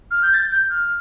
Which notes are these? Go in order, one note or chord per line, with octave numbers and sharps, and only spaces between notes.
F6
G6
A6
G6
F6